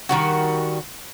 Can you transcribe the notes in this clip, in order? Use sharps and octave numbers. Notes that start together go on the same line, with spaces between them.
D#3 G3 F#4